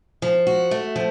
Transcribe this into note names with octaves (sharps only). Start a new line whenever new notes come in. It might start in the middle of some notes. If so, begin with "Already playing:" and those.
F3
F#4
A3
F3